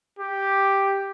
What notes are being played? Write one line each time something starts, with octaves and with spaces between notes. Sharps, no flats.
G4